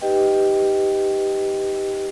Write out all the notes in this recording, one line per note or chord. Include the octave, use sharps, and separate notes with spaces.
D#4 G4 B4 D#5 G5